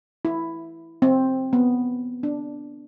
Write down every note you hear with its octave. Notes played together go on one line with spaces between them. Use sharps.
E4
C4
B3
D4